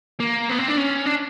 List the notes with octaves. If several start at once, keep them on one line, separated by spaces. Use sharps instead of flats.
A#3
B3
C4
D4
C#4
D4